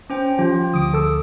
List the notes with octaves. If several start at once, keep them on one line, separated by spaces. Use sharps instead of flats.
C#4 C5 G5
F3 F4 G4
D2 D6 D#6
A4 E6